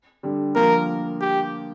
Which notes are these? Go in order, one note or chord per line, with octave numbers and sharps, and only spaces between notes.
D3 G3
F3 A#3 A#4
G4